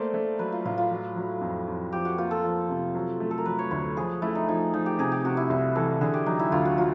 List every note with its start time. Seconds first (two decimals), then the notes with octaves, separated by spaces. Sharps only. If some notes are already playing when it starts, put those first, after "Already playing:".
Already playing: A3 A#3 A4 C5 D5
0.14 A3
0.39 F#3 B4
0.52 F4
0.65 A2 F4
0.78 F4
0.91 F#3
1.16 F#3
1.41 F2
1.68 F2
1.93 F3 G4
2.05 F#4
2.18 A#3 F4
2.31 A4
2.44 F3
2.69 C3
2.95 F#3
3.20 A3
3.31 A4
3.38 A#4
3.46 F#3 B4
3.59 C#5
3.71 D2 C#5
3.97 F3 G#4
4.22 A3 E4
4.35 D#4
4.48 F3 D#4
4.74 F3 D#4
4.86 G4
4.98 C3 G#4
5.12 G4
5.24 C3 F#4
5.37 E4
5.50 C2 E4
5.76 E3 A4
6.01 D3 G#4
6.14 G4
6.26 F#3 D#4
6.39 E4
6.52 D2 F4
6.65 F#4
6.78 F#3 F4